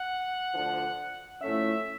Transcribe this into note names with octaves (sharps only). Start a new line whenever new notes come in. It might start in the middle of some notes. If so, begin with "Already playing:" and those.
Already playing: F#5
D2 D3 F3
A2 F3 A3 C#4 E5